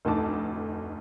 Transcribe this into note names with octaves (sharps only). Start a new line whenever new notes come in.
F1 D2 A2 D#4 A5 D6